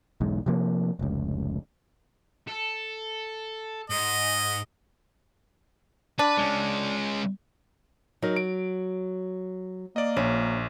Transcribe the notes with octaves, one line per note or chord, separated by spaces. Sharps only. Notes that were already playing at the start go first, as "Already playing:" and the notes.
B1 E2 G#2
C3 F3 A#3
F1 C#2
A4
G#2 D#5
D4 B4
G#3 C#4
F#3 D#4 A#4
D7
A#3 D5 D#5
A#1 C#4